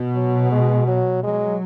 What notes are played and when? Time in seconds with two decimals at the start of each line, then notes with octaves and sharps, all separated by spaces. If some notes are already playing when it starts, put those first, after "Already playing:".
Already playing: B2
0.15 F#3
0.52 G#3
0.88 F#3
1.23 F#3 G#3